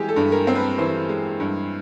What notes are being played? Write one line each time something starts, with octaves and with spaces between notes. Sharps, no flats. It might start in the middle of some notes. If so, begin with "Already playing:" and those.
Already playing: E3 G#3 G4 G#4
A4
G2
A#4
C4
B4
E3 C5
G#3
G2